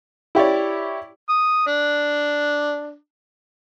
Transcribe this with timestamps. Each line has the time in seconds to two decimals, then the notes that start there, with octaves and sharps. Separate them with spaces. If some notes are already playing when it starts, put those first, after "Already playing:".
0.35 E4 G4 C#5 D5
1.29 D#6
1.67 D4